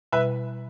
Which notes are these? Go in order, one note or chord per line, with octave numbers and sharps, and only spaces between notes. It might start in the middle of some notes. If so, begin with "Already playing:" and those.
B2 G3 E4 B4 E5